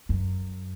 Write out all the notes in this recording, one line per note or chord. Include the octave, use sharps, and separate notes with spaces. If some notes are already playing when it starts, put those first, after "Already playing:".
F#2